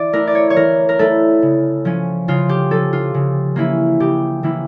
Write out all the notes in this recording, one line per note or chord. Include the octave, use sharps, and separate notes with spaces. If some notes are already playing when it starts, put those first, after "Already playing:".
Already playing: E3 D5
A3 E4 A#4
D5
C#5
C#5
E3 A#4
A#4
A3 E4 A4
C#3
F3 C#4
C#3 F4
G4
F3 C#4 A4
F4
C#3
E3 A#3 C#4 E4
C#3 G4
E3 A#3 C#4 E4